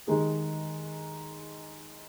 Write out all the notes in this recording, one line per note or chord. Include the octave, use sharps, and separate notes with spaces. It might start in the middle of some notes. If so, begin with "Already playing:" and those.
D#3 G#3 D#4 G#4